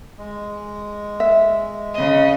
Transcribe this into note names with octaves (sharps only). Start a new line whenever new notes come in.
G#3
E5
C#3 D#5